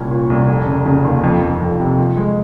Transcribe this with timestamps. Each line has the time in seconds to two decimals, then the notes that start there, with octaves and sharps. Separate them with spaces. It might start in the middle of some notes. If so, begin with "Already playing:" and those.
Already playing: C2 A#2 C#4
0.11 A#2
0.30 C2
0.47 F1
0.66 C#3
0.85 C#3
1.05 D#2
1.23 F2
1.42 F2
1.61 F2
1.80 C3
1.98 F3
2.17 G#3